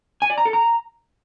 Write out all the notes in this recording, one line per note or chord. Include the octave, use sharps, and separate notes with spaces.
G#5
D5
A#5
A4
A#5